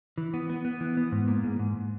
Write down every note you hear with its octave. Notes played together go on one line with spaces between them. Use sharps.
E3
B3
B3
B3
E3
B3
G#2
A#3
G#2
G#2